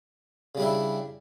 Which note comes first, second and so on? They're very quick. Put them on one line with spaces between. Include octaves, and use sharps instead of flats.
C#3 G3 D4 E4